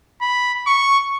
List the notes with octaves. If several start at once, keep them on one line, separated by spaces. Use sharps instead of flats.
B5
C#6